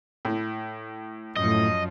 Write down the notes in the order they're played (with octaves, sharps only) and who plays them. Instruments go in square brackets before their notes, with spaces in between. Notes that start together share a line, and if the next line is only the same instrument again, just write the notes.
[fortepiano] A2
[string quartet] F#2 F3 [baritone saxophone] A2 [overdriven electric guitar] D#5